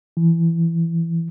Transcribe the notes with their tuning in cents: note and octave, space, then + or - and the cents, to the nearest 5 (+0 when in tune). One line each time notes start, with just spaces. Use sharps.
E3 +15